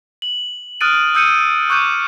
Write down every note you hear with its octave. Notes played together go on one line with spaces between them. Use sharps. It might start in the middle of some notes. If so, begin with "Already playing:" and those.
F#7
D#6 F6 F#6 A6 D7 D#7
D#6 E6 G6 C#7 D#7
C#6 D6 F#6 G6 D#7